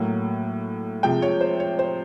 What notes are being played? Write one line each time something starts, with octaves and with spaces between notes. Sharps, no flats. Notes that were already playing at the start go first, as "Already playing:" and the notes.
Already playing: A2 F#3 A#3
C3 F3 G#3 G5
C#5
C5
C#5
C5